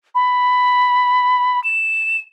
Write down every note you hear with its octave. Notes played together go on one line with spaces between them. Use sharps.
B5
E7